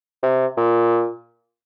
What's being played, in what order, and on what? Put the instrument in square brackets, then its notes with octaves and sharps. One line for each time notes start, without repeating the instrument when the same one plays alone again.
[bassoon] C3
A#2